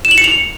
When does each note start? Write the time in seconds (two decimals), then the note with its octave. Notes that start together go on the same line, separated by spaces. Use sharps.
0.05 E7
0.11 F#7
0.18 C#7
0.24 F7